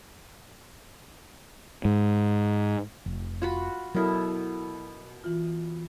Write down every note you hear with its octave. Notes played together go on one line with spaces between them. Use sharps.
G#2
F1
F4 F#4 B5
B2 F#3 E4 A4 A#4 D#6 F6
E3 F4